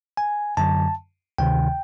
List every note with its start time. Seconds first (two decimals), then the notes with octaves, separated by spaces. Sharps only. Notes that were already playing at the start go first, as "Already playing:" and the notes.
0.17 G#5
0.57 F#2 D3 F#3 A5
1.38 D2 C3 D#3 G5